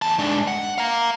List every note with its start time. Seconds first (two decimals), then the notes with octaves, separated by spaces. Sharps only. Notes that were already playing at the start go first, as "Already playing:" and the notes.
0.02 E2 A5
0.19 G#2 D4
0.48 F#5
0.78 F5 A#5